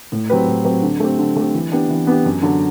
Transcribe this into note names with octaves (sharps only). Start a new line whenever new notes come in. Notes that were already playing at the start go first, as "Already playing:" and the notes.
A2
F#3 C4 G4 B4
A2
F#3 C4 G4 B4
D3
A3 C4 G4
D3
A3 C4 G4
E3
B3 D4 G4
E3
B3 D4 G4
F#2
D3 F#3